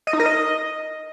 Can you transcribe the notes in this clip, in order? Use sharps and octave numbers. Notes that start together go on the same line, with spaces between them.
D#5
D#4
A#4
D#5